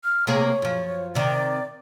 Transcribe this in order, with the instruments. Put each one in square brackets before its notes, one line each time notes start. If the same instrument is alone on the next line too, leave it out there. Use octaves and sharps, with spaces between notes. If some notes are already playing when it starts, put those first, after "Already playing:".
[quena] F6
[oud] C3 A#3 G#4 [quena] C#5
[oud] F#2 F3
[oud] C3 D#3 [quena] D5